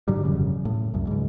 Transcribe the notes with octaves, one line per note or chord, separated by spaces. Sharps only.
G#2 D3 F#3 G3
E1 F#2 C#3
A2
C2 F#2
C#2 G#2